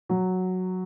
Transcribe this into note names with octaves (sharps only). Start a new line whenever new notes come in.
F#3